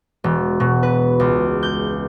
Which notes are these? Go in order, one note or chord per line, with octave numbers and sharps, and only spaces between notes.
E1
B2
B4
C#2
G6